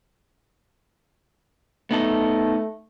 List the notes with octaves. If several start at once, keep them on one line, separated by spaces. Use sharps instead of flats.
A3 B3 D#4 A4